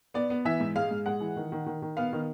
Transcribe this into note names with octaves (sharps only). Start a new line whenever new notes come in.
B3 D5
B3
E3 E5
G#2
G#3 F5
G#2
G#3 F#5
E3
D#3
D#3
D#3
D#3
B3 F5
D#3